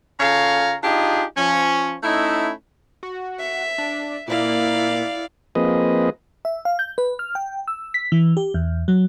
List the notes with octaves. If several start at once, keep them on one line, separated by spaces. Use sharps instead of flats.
C#3 F4 A4 C#5 F5 A#5
D4 D#4 F4 G4 G#4
F3 C#4
A3 C#4 D#4 E4
F#4
E5
D4
A#2 A#3 E4 D5 F5
F3 A#3 C4 G#4 B4 D#5
E5
F5
G6
B4
F6
G5
E6
B6
E3
G4
E2
F#3